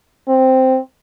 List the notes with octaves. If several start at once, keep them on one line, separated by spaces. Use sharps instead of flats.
C4